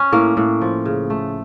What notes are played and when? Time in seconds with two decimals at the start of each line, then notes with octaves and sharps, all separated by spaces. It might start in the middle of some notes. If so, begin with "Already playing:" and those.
Already playing: C#4
0.12 A2 A#3
0.37 A2
0.61 F3
0.85 C#3
1.10 A3